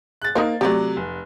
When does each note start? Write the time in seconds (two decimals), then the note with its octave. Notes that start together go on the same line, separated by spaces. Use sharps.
0.22 F#6 A6
0.35 A#3 D#4 A#4 C5
0.61 C3 F#3 A3 G4 D5
0.97 F1